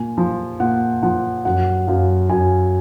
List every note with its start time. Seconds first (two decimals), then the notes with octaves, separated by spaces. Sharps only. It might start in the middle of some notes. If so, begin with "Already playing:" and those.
Already playing: A#2 G#5
0.18 F3
0.60 A#2 F#5
1.03 F3 F#5
1.45 F#2 F#5
1.87 F#2 F5
2.29 F#2 G#5